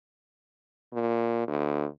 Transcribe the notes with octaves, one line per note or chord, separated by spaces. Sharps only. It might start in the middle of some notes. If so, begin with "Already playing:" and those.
A#2
D2